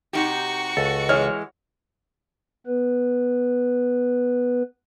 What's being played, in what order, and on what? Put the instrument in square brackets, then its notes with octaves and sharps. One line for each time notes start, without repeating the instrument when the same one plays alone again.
[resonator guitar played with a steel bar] C3 D#4 G4 [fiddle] F#4 C#6
[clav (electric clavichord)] C#2 A4
[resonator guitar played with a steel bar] E3 G#3 [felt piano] C#5 D#5 F6
[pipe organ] B3 B4